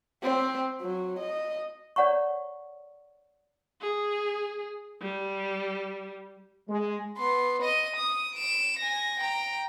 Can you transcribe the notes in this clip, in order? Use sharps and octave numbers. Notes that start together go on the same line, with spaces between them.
C4
F#3
D#5
C#5 D5 F#5 A#5 C#6
G#4
G3
G#3
B3 C6
D#5 D#7
D#6
D7 E7
G#5 A#6
G5 A#5